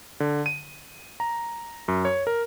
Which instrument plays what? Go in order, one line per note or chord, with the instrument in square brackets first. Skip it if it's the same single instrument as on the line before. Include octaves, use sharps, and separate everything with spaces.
[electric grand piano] D3
D#7
A#5
F#2
C#5
A#4